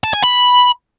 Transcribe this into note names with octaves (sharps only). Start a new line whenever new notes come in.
A5
G#5
B5